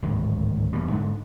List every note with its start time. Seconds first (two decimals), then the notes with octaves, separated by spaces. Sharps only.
0.02 D1 G#1 C#2 C#3
0.73 E2 B2 G3
0.91 G#2 D3